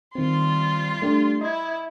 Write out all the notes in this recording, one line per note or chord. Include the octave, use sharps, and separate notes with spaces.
D#3 G3 C4 F4 C6
A3 D4 G4
E4 D#5 G#6